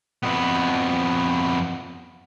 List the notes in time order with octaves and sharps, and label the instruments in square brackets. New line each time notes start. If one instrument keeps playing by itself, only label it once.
[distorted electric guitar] F2 B3